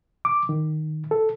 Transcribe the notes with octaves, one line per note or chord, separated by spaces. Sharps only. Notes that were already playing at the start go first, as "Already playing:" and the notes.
D6
D#3
A4